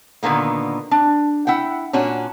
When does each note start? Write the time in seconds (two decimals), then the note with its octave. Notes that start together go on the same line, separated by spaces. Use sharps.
0.23 A#2 D3 D#3 A#3 B3
0.91 D4
1.47 E4 F#5 G5
1.93 A#2 C#4 D4 F#4